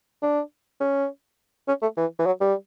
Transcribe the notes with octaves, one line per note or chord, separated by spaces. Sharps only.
D4
C#4
C#4
A3
E3
E3
F#3
G3